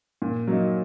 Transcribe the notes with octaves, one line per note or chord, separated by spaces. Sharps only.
A#2
F#3 A#3 D#4